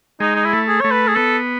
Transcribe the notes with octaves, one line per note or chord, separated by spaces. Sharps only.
G#3 D#4
D#4
E4
A3
G#4
A3 C#5
B4
G#4
B3 A4